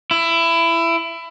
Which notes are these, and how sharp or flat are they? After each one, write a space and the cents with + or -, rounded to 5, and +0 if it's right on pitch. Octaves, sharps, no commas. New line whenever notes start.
E4 +20